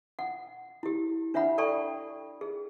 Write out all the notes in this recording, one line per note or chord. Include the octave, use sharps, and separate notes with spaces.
F#5
E4 G4
D4 C#5 E5 F#5 B5
A4 D5 G5 A5 B5 C#6
G#4